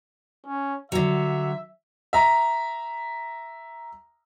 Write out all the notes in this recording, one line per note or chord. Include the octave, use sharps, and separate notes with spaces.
C#4
D3 F#3 E5
E5 A#5